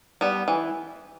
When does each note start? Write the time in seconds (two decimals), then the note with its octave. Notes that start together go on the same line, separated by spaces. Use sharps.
0.21 G3 B3
0.48 E3